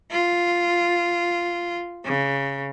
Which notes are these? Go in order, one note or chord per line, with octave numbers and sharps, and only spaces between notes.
F4
C#3